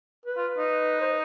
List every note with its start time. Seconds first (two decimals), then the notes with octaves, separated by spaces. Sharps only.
0.25 B4
0.37 F4
0.58 D#4
1.01 C5